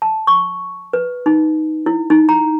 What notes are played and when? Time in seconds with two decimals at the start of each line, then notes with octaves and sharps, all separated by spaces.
0.02 A5
0.27 C#6
0.93 B4
1.26 D#4
1.86 E4
2.10 D#4
2.29 A#5